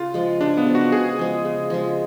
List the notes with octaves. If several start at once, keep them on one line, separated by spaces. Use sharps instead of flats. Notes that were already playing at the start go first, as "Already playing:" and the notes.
Already playing: C#3 F4
F3 G#3
C#3 D4
B3
F3 G#3
F#4
C#3 G#4
F3 G#3
C#3
F3 G#3